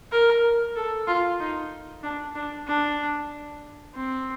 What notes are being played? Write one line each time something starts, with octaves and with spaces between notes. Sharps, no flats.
A#4
A4
F4
D#4
D4
D4
D4
C4